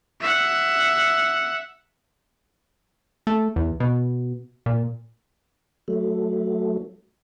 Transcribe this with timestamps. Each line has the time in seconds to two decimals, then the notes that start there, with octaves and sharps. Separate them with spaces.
0.21 E5 F#5
3.27 A3
3.56 E2
3.80 B2
4.66 A#2
5.88 F#3 A3